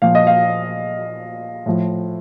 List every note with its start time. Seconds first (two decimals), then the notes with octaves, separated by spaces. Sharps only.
0.02 A#2 F3 F5
0.15 D#5
0.27 F5
1.66 A2 F3